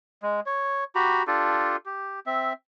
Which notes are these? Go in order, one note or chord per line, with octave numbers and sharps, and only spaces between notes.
G#3
C#5
F#4 G4 A#5 B5
D4 F4 G4 A4
G4
C4 E5